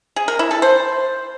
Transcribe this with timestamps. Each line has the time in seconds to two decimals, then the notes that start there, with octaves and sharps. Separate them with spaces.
0.16 G#4
0.28 A#4
0.39 E4
0.51 A4
0.62 C5